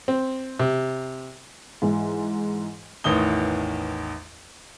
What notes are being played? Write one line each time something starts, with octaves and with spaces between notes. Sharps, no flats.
C4
C3
G#2 E3
A1 E2 D#3 D#6 G7